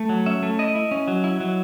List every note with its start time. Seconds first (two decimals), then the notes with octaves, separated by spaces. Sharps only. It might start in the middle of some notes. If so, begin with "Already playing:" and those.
Already playing: A3
0.09 F#3
0.26 C#4 E5
0.43 A3
0.59 E4 D#5
0.75 E4
0.91 C#4
1.08 F#3
1.24 E4
1.40 F#3